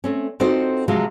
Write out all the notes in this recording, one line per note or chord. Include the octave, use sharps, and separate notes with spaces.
A3 C4 C#4
C4 D#4 F4 F#4 A4 C5
C3 F3 F#3 G#3 C4